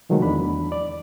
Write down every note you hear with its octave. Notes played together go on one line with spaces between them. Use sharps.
C3 D#3 F3 F#3 G#3 A3
E2 D4 B5
D5